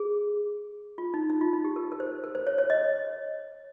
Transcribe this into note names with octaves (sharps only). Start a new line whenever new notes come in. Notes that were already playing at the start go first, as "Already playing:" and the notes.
Already playing: G#4
F4
D#4
D#4
F4
D#4
G4
A#4
A#4
C5
A#4
C5
C#5
C#5
D#5